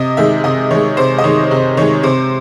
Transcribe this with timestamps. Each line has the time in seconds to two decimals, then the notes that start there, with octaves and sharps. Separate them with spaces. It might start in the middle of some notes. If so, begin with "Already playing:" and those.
Already playing: C3 D#5
0.17 D#3 G#3 E5
0.44 C3 D#5
0.71 D#3 G#3 C#5
0.97 C3 C5
1.19 D#5
1.24 D#3 G#3 C#5
1.51 C3
1.77 D#3 G#3 C#5
2.03 C3 C5